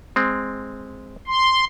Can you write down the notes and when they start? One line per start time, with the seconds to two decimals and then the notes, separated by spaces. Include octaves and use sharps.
0.16 G#3 C4
1.27 C6